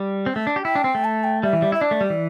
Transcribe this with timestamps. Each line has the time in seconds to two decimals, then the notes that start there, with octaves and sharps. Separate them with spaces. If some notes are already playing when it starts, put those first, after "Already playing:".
Already playing: G3
0.26 C4
0.36 A3
0.47 D4
0.56 G4
0.65 E4 G5
0.75 D4
0.84 C4
0.95 A3
1.04 A5
1.24 G5
1.43 G3 E5
1.53 E3
1.62 G3
1.72 E4 E5
1.81 D4 D5
1.91 A3
2.01 G3
2.10 E3